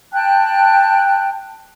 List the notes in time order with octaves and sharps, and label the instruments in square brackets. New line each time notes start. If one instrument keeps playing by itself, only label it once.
[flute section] G5 A5 F#6